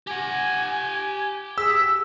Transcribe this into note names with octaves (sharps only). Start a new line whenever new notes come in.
G4 F#5 G#5
G#4 E6 B6